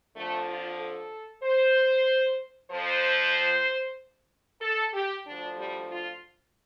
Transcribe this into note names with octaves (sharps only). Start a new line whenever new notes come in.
F2 D3 F3 A3
F4
A4
C5
F2 F3 C5
A4
G4
D2 D3 F3 D4
G3
F4